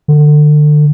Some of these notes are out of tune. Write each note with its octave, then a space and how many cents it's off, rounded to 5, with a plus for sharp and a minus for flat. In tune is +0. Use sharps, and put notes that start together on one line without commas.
D3 +30